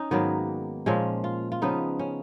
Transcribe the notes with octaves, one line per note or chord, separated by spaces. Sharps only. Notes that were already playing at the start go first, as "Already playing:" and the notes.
Already playing: C#4 D#4
G#2 D#3 F#3 A#3 B3
A#2 F3 G#3 C#4
F4
F4
C#3 F3 B3 D#4
C#4